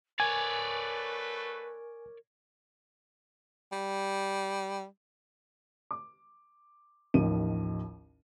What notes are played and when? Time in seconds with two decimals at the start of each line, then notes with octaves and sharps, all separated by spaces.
0.20 A3 F#4 A#4 B4 C#5 D5 G#5
3.72 G3
5.91 D6
7.14 A1 D#2 D#3 F3 D#7